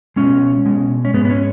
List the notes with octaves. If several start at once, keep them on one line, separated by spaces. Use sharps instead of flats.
B2 G#3 C#4
B2 G#3
C#4
G#2 G#3 B3
B3
C#4